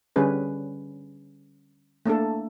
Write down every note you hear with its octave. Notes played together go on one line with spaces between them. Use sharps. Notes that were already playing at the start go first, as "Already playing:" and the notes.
D3 G3 C#4 G#4 B4
A3 A#3 D4 A4